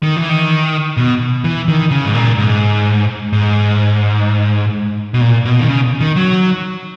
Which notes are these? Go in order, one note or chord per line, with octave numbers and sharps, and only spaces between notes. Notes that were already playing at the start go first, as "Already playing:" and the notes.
D#3
E3
D#3
B2
E3
D#3
C#3
G#2
A#2
G#2
G#2
B2
A#2
B2
D#3
C#3
D#3
F#3